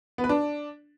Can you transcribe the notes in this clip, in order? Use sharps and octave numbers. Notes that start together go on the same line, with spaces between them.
B3
B4
D4